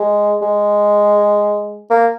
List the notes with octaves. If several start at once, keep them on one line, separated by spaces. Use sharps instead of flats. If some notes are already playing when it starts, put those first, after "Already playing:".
Already playing: G#3
G#3
A#3